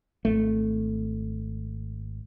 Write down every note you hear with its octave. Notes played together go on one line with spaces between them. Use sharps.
G#1 A3